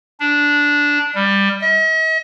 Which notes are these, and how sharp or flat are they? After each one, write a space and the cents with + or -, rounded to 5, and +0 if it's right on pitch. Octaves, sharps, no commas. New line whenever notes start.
D4 -10
G3 +15
D#5 +45